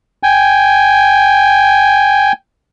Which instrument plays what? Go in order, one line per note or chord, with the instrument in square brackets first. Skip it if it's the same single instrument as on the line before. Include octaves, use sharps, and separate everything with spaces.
[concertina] G5 G#5